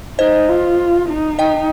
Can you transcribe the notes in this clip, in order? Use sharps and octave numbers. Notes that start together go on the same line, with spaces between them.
D#4 C5 D#5
F4
D#4
D#5 G5